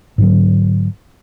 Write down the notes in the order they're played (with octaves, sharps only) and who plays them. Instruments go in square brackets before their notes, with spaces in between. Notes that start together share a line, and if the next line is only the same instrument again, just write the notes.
[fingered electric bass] G#2 D3 F#3